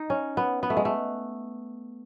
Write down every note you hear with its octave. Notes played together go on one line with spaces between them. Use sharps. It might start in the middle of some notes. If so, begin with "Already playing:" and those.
Already playing: D#4
C#4
B3
B3
A3
G#3
A3